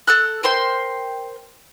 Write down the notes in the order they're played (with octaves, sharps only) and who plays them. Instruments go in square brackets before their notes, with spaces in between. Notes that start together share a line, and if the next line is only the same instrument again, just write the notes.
[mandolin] A4 E6 F#6
A#4 C5 G5 C6